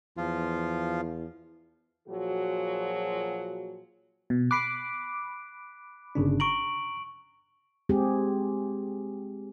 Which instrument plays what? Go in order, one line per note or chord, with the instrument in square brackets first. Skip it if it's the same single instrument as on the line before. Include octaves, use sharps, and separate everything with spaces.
[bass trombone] E2 [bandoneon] F3 F4
[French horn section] A#2 F3 F#3 F#4 G#4
[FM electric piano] B2
[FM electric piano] B5 D6 [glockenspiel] F#6 C7 D7
[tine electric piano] G1 C#3 D4
[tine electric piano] A#5 [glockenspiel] C#6 D7 F#7
[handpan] G#3 C4 G4 G#4